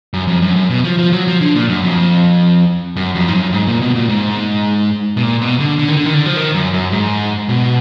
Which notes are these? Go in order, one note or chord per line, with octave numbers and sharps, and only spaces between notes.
F#2
F2
F#2
F#2
B2
F3
F3
F#3
F3
D3
A#2
F#2
F2
F#2
F2
G#2
F#2
G#2
A#2
B2
A#2
G#2
B2
A#2
B2
D3
D3
D#3
D3
D#3
D3
F3
D#3
F#2
F#2
G#2
B2